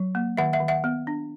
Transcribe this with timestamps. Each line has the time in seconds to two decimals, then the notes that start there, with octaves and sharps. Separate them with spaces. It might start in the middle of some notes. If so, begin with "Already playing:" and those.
Already playing: F#3
0.15 A#3
0.37 D#3 E5 F#5
0.53 E5 F#5
0.60 D#3
0.68 E5 F#5
0.84 B3
1.07 D4